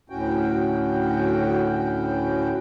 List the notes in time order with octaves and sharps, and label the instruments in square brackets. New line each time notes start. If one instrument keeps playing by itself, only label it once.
[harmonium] D2 A2 C#4 F#4 G5